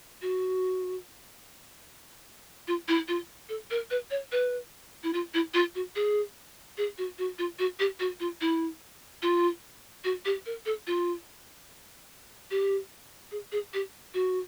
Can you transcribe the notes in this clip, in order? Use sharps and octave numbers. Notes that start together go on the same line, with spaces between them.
F#4
F4
E4
F4
A4
A#4
B4
C#5
B4
E4
F4
E4
F4
F#4
G#4
G#4
F#4
F#4
F4
F#4
G4
F#4
F4
E4
F4
F#4
G4
A#4
A4
F4
G4
G#4
G#4
G4
F#4